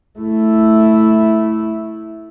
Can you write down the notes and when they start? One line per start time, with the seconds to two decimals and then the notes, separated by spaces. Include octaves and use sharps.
0.19 A3 E4